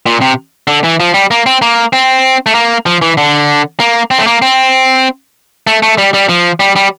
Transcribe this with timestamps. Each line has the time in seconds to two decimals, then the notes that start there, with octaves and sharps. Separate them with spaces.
0.06 A#2
0.21 C3
0.68 D3
0.84 E3
1.00 F3
1.14 G3
1.31 A#3
1.46 C4
1.62 A#3
1.93 C4
2.46 A3
2.55 A#3
2.86 F3
3.02 E3
3.17 D3
3.80 A#3
4.11 C4
4.19 A3
4.27 A#3
4.42 C4
5.67 A3
5.82 A3
5.98 G3
6.14 G3
6.29 F3
6.60 G3
6.76 G3